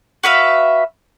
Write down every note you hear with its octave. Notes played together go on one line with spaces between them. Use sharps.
F#4 B4 E5 F5